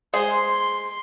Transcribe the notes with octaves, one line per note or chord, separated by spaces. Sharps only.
G#3 G#4 C5 C6